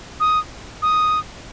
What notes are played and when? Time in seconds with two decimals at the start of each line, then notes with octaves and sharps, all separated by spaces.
0.20 D#6
0.82 D#6